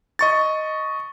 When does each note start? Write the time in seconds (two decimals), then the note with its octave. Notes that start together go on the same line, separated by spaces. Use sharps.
0.19 D#5 C#6 A6